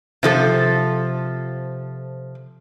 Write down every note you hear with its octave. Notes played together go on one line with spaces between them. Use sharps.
C3 F3 A4